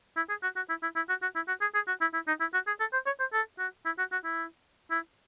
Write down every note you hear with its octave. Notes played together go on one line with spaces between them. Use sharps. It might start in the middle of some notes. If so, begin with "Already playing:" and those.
E4
G#4
F#4
F#4
E4
E4
E4
F#4
F#4
E4
F#4
G#4
G#4
F#4
E4
E4
D#4
E4
F#4
G#4
A4
C5
C#5
C5
A4
F#4
E4
F#4
F#4
E4
E4